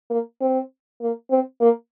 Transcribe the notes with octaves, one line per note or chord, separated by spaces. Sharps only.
A#3
C4
A#3
C4
A#3